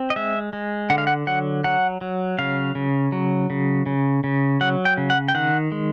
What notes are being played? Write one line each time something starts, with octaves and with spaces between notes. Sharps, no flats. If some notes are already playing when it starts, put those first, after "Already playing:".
Already playing: C4
D#5
G#3 E5
G#3
D3 F#5
F5
F#5
F#3 F#5
F#3 F#5
F#3
C#3 F5
C#3
F#3
C#3
C#3
C#3
F#3 F#5
G5
C#3
F#5
G5
D#3 F#5
G#3